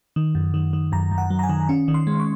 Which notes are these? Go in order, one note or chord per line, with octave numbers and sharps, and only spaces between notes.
D#3
F#2
D#3
D#3
F#2 A#5
F#2
F#5
F#3
A#5
G#5
D#3
C#4
D#3
C6
G#3
C#6